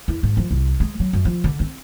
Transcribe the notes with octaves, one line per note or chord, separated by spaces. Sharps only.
E2
G#2
F3
C2
G#3
F#3
F#2
F3
D3
C4